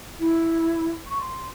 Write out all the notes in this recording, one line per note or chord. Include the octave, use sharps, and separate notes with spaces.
E4
C#6
C6